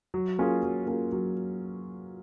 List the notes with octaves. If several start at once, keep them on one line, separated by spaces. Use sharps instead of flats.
F#3
A#3 C#4 F4 G#4
F#3
A#3 C#4 F4 G#4
F#3